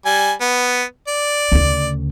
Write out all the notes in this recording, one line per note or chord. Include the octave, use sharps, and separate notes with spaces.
G3 G#5
B3
D5
D2 C#3